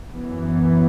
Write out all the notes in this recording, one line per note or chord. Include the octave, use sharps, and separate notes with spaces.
F#2 E3 B3